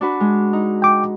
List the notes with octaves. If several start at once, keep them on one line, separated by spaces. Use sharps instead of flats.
D4 F#4 B4
G#3
D#4
G5 D6